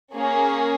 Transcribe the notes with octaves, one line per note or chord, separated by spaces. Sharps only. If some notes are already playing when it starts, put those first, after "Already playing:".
A#3 C#4 G#4